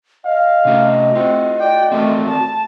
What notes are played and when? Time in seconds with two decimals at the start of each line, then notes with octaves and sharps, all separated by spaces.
0.25 D#5 F5
0.65 C3 A3 C#4 F#4
1.15 C4 F4 F#4
1.60 D5 G5
1.92 A3 C4 F#4 A#4
2.28 A5